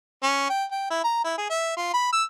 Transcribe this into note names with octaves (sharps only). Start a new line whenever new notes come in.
C#4
G5
G5
E4
A#5
E4
G#4
E5
F4
B5
E6